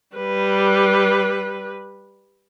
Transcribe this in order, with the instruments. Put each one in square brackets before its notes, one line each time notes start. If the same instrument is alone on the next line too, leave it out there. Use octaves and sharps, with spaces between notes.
[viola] G3 B4